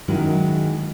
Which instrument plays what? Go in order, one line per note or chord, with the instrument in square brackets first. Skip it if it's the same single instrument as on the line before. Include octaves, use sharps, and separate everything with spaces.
[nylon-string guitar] D#3 F#3 G#3 C#4 E4